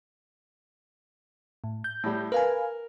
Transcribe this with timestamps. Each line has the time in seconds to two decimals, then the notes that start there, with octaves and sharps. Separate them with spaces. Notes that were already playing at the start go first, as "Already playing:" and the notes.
1.64 A2
1.84 G6
2.03 A2 G3
2.32 A#4 B4 F5 G#5